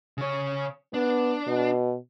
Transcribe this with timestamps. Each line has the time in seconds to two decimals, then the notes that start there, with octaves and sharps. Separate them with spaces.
0.18 C#3 C#5
0.94 B3 D4
1.47 B2